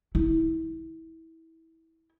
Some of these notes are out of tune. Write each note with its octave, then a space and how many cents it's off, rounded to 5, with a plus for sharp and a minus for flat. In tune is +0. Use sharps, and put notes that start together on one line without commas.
E4 -25